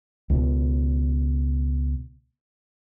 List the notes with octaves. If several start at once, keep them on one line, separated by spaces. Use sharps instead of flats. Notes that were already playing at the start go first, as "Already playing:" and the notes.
C#2 B2